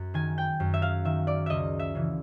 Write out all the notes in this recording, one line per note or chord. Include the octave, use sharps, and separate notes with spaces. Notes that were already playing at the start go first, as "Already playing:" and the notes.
Already playing: F#2
D#3 G#5
G5
F#2
E5
F5
D#3 E5
D5
C#2 D#5 E5
E5
C#3 E3